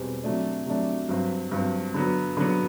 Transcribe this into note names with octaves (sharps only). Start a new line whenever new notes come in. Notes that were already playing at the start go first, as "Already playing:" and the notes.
Already playing: E2 B2 G3 C4
C3 F#3 A3 D4
C3 F#3 A3 D4
G2 F#3 C4
G2 F#3 C4
D3 F#3 B3
D3 F#3 B3